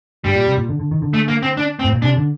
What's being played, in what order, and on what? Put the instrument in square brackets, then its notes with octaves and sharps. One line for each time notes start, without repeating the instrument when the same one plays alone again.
[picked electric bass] G2 [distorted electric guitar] G3
[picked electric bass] A#2
C3
A#2
D3
D3
D#3
D3
[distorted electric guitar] A3
A#3
C4
D4
C4
[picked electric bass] A2
A#2
[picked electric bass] C3 [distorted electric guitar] D4
[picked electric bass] D3